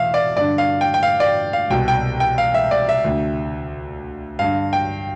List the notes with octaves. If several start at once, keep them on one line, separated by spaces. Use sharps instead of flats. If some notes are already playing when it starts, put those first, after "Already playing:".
Already playing: E2 B2 E5 F5
D5
G2 D3 D5
F5
G5
G5
F5
D5
F5
C2 B2 G5
G5
G5
F5
E5
D5
E5
D2 D3
G2 D3 F5
G5